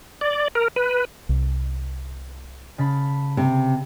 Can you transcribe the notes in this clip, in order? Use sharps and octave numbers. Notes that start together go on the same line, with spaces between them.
D5
A#4
B4
C2
C#3 A5 B5
C3